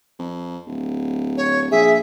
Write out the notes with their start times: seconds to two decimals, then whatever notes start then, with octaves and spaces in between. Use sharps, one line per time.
0.19 F2
0.67 D1
1.37 C#5
1.71 A#1 G#4 E5